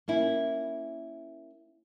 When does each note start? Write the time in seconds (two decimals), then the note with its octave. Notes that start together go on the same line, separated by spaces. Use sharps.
0.08 A#3 C#4 E4